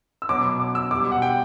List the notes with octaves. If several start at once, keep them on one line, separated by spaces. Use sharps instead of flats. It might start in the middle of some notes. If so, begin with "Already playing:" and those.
E6
B2 F#3 D6
D6
E6
B2 D6
G3
F#5
G5